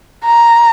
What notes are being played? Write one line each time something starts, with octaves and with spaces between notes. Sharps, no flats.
A#5